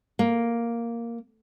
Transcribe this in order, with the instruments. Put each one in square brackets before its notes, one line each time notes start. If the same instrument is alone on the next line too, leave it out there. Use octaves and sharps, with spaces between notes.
[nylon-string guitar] A#3